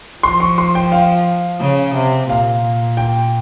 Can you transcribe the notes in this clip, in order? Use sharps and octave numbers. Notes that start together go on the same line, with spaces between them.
F3 C6
C#6
C6
G5
F5
C#3
C3
A#2 F5
G5